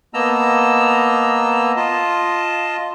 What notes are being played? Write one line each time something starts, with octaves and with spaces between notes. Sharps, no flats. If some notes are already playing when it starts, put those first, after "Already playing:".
A#3 B3 D#5 A5 A#5 E6
F4 D#5 A5